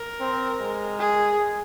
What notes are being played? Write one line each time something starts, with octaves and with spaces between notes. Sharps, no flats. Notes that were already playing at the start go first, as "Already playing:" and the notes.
Already playing: A#4
C4
G#3
G#4